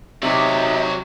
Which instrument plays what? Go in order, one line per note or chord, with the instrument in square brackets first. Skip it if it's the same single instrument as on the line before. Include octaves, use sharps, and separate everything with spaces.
[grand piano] C3 [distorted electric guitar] F#3 D5 [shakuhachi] D#4 [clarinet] E5